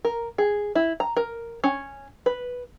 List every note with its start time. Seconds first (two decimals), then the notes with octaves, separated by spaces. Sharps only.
0.05 A#4
0.38 G#4
0.75 E4
1.00 A#5
1.17 A#4
1.64 C#4
2.26 B4